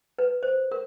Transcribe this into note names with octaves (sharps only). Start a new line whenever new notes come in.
B4
C5
A#4